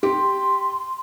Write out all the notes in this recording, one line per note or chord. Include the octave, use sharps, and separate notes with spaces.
G4 C6